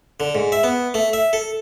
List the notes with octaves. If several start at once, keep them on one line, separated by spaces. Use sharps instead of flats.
D3
G#2
E5
B3
A3
E5
A4